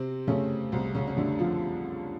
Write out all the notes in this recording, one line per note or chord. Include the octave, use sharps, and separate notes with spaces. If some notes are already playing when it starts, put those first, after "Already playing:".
Already playing: C3 C4
C#3 A3 C#4
C2 C4
C#3 C#4
C#4
D3 A3 D4
F3 F4